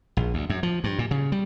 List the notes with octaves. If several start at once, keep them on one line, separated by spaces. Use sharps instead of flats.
A#1
D2
F#2
F3
G2
A#2
C#3
G3